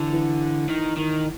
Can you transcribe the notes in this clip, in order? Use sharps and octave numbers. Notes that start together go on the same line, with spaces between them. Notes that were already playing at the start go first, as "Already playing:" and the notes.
Already playing: D3 E3
E3
D#3
D#3